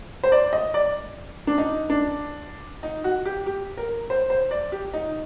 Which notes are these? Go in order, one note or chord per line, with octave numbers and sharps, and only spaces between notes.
C5
D5
D#5
D5
D4
D#4
D4
D#4
F#4
G4
G4
A#4
C5
C5
D5
G4
D#4